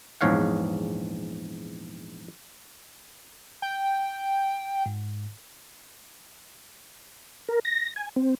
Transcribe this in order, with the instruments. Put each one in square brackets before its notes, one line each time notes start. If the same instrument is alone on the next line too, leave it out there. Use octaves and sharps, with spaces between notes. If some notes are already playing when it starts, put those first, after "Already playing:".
[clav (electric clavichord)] A#1 E2 G#2 C#5 F5 F#5
[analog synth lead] G5
[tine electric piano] G#2
[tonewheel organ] A#4
A#6
G#5
C4